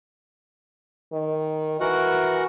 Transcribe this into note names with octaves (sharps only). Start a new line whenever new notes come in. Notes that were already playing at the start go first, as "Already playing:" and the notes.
D#3
E3 F#4 A#4 F#5